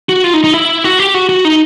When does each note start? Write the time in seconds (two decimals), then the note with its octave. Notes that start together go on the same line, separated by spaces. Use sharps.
0.09 F#4
0.24 F4
0.34 D#4
0.44 D#4
0.54 E4
0.84 F#4
0.99 G4
1.14 F#4
1.29 F#4
1.45 D#4